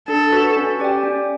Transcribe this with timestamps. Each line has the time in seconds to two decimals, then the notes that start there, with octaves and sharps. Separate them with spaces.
0.08 D4 A4
0.32 F#4 B4
0.57 C#4
0.80 G4 D5 G5
1.04 C#4